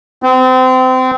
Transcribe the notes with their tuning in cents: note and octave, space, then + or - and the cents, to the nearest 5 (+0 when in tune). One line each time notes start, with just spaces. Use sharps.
C4 -30